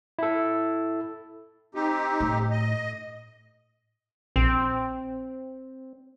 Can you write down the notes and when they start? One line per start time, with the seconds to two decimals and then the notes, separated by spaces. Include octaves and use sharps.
0.19 E4 A4
1.75 C4 D#4 G4
2.20 A2
2.51 D#5
4.36 A#1 C4